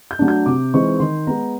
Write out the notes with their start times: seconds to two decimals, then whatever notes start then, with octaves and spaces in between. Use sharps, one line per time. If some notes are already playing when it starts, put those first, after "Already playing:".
0.11 G6
0.19 F#3 A3 D4
0.28 G6
0.46 C3 D6
0.74 E3 G#3 C4 D#4 C#6
0.99 D#3 C6
1.27 G#3 B3 A#5